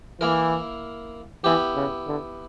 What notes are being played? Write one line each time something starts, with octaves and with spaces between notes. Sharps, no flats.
E3 A#3 E4 A#4
E3 B3 E4 G4
C#3
D3